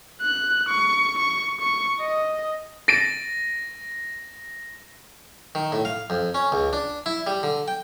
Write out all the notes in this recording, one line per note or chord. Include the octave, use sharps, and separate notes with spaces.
F#6
C#6
C#6
C#6
D#5
A6 A#6 D7 D#7
D#3
A2
F5
F2
C#4
C#2
D4
E4
G3
D3
G5